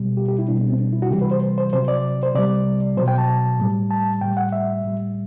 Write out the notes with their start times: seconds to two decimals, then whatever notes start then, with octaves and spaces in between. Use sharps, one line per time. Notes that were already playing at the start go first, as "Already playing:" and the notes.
Already playing: B2 G3
0.17 G4
0.28 G4
0.39 E4
0.48 B2 G3 D4
0.59 B3
0.70 C4
0.80 D4
0.93 E4
1.02 F#4
1.11 C3 E3 G3 G4
1.21 B4
1.31 C5
1.58 C5
1.73 C3 F#3 C5
1.88 D5
2.23 C5
2.35 C3 G3 D5
2.97 B2 F#3 C5
3.08 G5
3.18 A5
3.59 A2 G3
3.91 A5
4.21 A2 G3 G5
4.37 F#5
4.52 E5
4.84 A2 G3